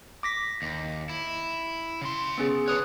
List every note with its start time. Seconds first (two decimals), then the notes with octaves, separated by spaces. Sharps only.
0.23 D6 A#6 B6
0.62 D#2
1.09 E4
2.02 C#3 C6
2.38 B3 C#4 G#4
2.68 D3 B4 C#5 D#6 F#6